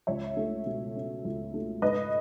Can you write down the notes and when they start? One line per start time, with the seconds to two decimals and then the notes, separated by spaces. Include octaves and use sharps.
0.07 C#2 C#5 E5
0.37 A3
0.66 B2
0.95 C#4
1.24 C#2
1.54 A3
1.82 G#2 B4 D#5